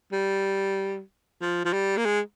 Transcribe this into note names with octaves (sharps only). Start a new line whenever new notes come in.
G3
F3
F3
G3
A#3
G#3